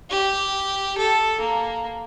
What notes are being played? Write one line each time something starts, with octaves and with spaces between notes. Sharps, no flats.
G4
A4
A#3